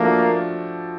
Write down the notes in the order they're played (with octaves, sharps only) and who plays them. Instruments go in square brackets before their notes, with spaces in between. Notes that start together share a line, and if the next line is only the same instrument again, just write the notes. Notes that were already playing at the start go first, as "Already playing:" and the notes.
Already playing: [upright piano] F3 A3 D4 F#4 [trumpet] A#3